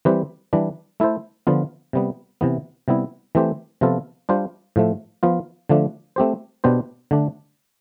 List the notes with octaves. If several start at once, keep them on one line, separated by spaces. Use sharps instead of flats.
E3 G3 C4 G4 B4
E3 G3 D4
A3 E4 A4 C5
D3 F3 B3 F4
C3 G3 B3
C3 E3 B3
C3 G3 B3 E4
E3 A3 C4 G4 C5
C3 F3 B3 F4 A4
G3 D4 F4 C5
A2 F3 A3
F3 B3 F4
D3 F3 A3 D4
A3 C4 G4 C5
B2 B3 D4 G4 C5
D3 A3 D4